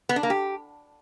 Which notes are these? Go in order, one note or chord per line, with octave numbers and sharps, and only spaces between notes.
B3
D4
A#3
G4